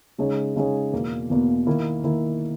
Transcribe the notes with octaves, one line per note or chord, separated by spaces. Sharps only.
C#3 G#3 D#4 G#4 C#5
C#3 G#3 D#4 G#4 C#5
E2 B2 A#3
E2 B2 A#3
D#3 A#3 E4 A#4
D#3 A#3 E4 A#4